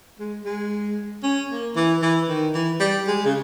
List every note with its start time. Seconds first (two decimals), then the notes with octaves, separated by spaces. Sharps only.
0.19 G#3
0.45 G#3
1.23 C#4
1.50 A#3
1.76 E3
2.02 E3
2.29 D#3
2.54 E3
2.80 G3
3.07 G#3
3.26 C#3